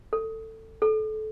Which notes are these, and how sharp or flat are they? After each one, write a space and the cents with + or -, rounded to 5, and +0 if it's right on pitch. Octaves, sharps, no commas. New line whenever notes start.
A4 +15
A4 -25